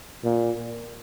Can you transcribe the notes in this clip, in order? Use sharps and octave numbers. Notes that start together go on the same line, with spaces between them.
A#2